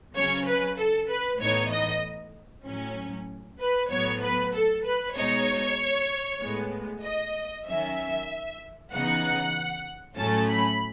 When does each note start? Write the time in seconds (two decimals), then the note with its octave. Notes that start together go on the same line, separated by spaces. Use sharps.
0.15 C#3 F#3 C#4 C#5
0.47 B4
0.78 A4
1.09 B4
1.40 A2 E3 B3 D#4 C#5
1.71 D#5
2.66 A2 F#3 C#4
3.60 B4
3.91 A2 F#3 B3 C#5
4.22 B4
4.54 A4
4.85 B4
5.16 B2 G#3 D#4 C#5
6.41 A2 G#3 B3
7.04 D#5
7.67 D#3 F#3 C#4 E5
8.92 C#3 E3 B3 D#4 F#5
10.17 A2 F#3 A3 C#4 A5
10.49 B5